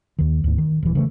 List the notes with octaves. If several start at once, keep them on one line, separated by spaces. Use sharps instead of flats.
D#2 D#3
D2 G#2
D#3
D#1 E3
C#3 E3 G#3 A3